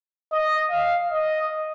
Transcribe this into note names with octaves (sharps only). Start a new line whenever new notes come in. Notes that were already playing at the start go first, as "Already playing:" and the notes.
D#5
F5
D#5